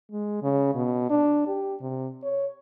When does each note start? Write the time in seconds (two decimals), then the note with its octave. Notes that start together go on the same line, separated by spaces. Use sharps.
0.11 G#3
0.43 C#3
0.75 B2
1.10 D4
1.47 G4
1.81 C3
2.23 C#5